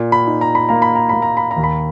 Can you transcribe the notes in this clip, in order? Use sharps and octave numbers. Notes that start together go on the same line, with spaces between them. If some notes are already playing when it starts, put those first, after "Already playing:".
Already playing: A#2
B5
D#4
A#5
B5
A#3 A#5
B5
A#5
A#3 B5
A#5
B5
A#5
D#2
B5